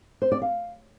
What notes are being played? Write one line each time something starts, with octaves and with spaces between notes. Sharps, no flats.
C5
D5
F5